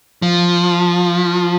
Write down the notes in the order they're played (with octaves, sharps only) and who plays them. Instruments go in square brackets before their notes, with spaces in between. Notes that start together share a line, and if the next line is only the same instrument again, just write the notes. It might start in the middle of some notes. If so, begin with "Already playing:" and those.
[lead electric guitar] F3